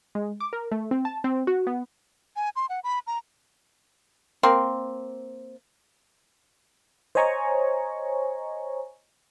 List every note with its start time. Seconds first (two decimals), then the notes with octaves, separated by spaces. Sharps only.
0.15 G#3
0.40 D6
0.53 A#4
0.71 A3
0.91 C4
1.05 A5
1.24 C4
1.47 F#4
1.67 B3
2.36 G#5
2.56 C6
2.69 F#5
2.84 B5
3.07 A#5
4.43 A#3 C4 C6
7.15 C5 C#5 D#5 G#5 A#5 C#6